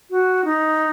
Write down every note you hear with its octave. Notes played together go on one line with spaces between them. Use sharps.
F#4
D#4